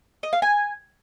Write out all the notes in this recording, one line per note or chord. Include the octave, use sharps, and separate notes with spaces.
D#5
F5
G#5